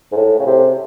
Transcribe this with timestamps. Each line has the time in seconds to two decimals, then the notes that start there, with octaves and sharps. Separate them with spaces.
0.12 G#2
0.16 A2
0.39 C#3
0.46 C3